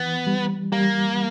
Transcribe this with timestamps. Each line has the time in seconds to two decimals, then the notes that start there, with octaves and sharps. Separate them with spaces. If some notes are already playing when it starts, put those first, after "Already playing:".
Already playing: E3 B3
0.27 G3
0.72 G3 A#3